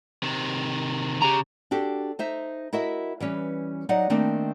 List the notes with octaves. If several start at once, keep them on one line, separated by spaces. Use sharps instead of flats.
C3 D#3
C#3 G4 A#5
D4 F#4 G4 A4
D#4 C5 E5
E4 F#4 A#4 D#5 E5
E3 G3 C#4 B4
F#3 D#4 D5 D#5 F#5
D#3 A3 A#3 C4 D4